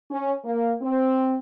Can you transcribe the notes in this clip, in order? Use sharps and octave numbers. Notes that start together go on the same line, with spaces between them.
C#4
A#3
C4